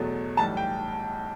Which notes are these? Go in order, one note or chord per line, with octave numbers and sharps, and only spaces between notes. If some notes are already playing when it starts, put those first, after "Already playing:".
Already playing: E2 B2 F#3 A3
B1 A2 E3 G3 A5
G5